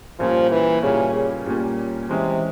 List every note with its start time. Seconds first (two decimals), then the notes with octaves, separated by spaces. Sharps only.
0.19 A#2 F3 G3 A#3 C#4
0.51 E3
0.82 A#2 C#3 G3 A#3 C#4
1.15 C#3
1.46 A#2 G3 A#3 C#4
2.09 C3 E3 G#3 C#4